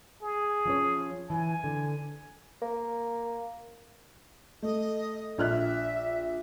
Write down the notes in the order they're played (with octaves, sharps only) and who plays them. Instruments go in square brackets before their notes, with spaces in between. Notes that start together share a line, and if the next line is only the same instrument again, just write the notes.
[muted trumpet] G#4
[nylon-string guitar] F3 C#4 C#5
[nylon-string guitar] E3 [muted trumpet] G#5
[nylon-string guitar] D3
[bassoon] A#3
[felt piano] A3 [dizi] D#5
[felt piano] A#1 F6 F#6 [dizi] E5